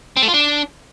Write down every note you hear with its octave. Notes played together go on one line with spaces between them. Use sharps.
C4
A3
F4
D4